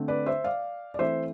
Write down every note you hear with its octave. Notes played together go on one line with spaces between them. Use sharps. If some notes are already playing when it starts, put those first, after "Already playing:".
Already playing: D3 A3 C4
B4 D5
C5 E5
D5 F5
D5
E3 A3 C4 C5 E5